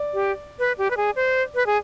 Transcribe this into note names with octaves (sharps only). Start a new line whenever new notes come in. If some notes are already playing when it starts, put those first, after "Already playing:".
Already playing: D5
G4
B4
G4
B4
G#4
C5
B4
G#4